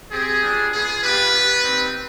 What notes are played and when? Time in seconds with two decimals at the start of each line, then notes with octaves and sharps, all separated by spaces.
0.12 C4 G4 G#4
0.42 G3 B3 D4 F4
0.73 B3 F4 G#4
1.02 B3 D4 F4 G4 B4
1.33 B3 D4 G4
1.63 C4 D#4 G4